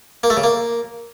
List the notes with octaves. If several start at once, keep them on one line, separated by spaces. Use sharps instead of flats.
A#3
A3
C#3
A#3